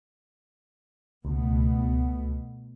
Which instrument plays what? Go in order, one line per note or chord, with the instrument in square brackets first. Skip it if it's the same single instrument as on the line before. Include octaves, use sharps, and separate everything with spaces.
[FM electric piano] C#2 [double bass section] B2 A3 B3